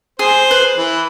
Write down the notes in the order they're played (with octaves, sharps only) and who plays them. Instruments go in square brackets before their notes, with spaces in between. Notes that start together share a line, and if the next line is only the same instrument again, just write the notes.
[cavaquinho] G#4 [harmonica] C5
[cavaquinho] B4
[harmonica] E3